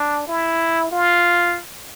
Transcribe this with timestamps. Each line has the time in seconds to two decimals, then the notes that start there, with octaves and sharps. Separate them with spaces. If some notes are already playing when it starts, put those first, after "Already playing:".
Already playing: D4
0.27 E4
0.92 F4